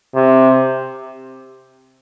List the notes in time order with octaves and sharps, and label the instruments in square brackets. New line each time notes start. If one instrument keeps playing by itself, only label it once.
[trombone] C3